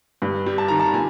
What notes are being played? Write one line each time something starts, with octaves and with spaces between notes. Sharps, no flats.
G2
G3
A5
D#3 A#5
A5
A#2 G#5